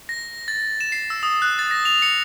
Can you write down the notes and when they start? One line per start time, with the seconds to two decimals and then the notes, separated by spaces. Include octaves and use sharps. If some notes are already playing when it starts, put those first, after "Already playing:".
0.09 A#6
0.48 A6
0.81 E7
0.92 C7
1.10 E6
1.23 D#6
1.42 F#6
1.59 A6
1.71 A#6
1.85 F7
2.02 C#7